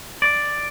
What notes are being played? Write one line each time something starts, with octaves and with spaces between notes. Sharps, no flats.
D5